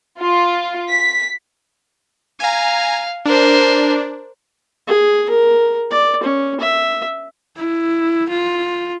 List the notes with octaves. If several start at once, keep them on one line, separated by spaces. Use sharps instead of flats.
F4
B6
F5 G#5 A#5
D4 A#4 C5
G#4
A#4
D5
C#4
E5
E4
F4